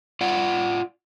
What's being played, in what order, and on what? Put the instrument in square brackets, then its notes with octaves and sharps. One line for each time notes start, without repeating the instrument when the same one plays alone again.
[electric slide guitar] F4 D5 F#5